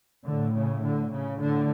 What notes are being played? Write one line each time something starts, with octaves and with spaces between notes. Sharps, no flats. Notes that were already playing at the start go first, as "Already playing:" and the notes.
A2 D3
C#3
D3
C#3
A2 D3